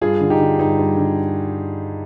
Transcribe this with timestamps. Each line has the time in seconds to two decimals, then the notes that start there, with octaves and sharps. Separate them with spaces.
0.01 G2 F4 G#4
0.21 D3
0.30 D#4 G4
0.40 D3
0.59 G2 D#4
0.78 G2
0.97 D3